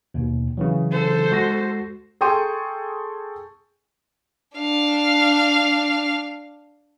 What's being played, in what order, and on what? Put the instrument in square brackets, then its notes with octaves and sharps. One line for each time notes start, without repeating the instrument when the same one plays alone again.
[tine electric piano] D#2 B2
C#3 E3 F#3
[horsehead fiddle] A4 C5
[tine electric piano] G#3 F#4 A#6
[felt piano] G#4 A4 G5 C6 C#6 D#7
[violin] D4 F5